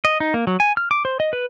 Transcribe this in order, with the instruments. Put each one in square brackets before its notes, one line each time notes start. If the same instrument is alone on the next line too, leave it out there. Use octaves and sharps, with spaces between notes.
[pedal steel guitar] D#5
D#4
A#3
F#3
G#5
F6
D6
C5
D#5
B4